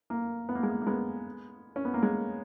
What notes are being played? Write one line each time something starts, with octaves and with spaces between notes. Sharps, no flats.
A#3
B3
A#3
G#3
A#3
A#3
G#3 B3
C#4
B3
A#3
G#3